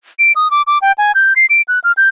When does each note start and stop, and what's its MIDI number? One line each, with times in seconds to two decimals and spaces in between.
0.19 0.32 98
0.36 0.50 87
0.51 0.62 86
0.67 0.78 86
0.82 0.92 79
0.98 1.12 80
1.15 1.33 91
1.36 1.46 96
1.50 1.62 98
1.68 1.79 90
1.84 1.92 89
1.97 2.09 91